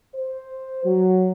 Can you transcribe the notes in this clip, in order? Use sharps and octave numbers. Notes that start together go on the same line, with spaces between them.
C5
F#3